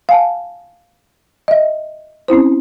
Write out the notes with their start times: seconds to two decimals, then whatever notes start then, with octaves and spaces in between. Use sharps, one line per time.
0.09 F5 G#5 A5
1.48 D#5 E5
2.28 C4 C#4 E4 C5